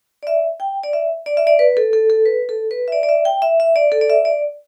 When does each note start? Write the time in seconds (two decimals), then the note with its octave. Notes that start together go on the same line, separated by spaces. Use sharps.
0.23 D5
0.27 E5
0.60 G5
0.83 D5
0.93 E5
1.26 D5
1.37 E5
1.47 D5
1.59 B4
1.77 A4
1.93 A4
2.10 A4
2.26 B4
2.49 A4
2.71 B4
2.88 E5
2.92 D5
3.03 D5
3.09 E5
3.25 G5
3.42 E5
3.60 E5
3.76 D5
3.92 A4
4.01 D5
4.10 E5
4.25 D5